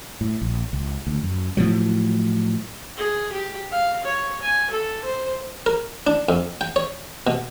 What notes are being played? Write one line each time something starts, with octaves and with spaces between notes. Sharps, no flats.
A2
A#1
C#2
D2
F#2
A2 F3 F#3
G#4
G4
F5
C#5
G#5
A4
C5
A#4
D4
F2
G5
C#5
B2